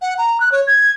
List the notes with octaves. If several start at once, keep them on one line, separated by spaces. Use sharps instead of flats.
F#5
A#5
F#6
C#5
G#6